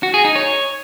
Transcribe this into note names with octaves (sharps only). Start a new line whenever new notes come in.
F#4
G#4
D#4
C#5